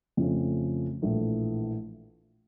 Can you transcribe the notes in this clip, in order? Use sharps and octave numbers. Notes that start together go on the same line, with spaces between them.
F2 C#3 F3 A3 C#4
A#1 A2 E3 A3